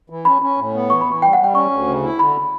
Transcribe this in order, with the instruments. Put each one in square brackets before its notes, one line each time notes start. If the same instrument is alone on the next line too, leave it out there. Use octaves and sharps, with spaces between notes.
[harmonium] E3
[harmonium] C#4 [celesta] B5
[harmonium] C#4
A2
B3
[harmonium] E3 [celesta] C#6
[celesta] B5
[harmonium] E3
[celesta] C#6
[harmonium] G3 [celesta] G5
[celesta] F#5
[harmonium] G3 [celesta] G5
[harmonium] C#4 [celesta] C#6
[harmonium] D2
C#3
E4
[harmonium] D3 [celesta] B5